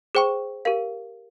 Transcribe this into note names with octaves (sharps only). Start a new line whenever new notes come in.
G#4 C5 G5 C#6
G4 A#4 F5